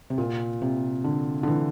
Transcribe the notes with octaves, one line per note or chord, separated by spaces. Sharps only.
C3
A#2
C3
D3
D3
E3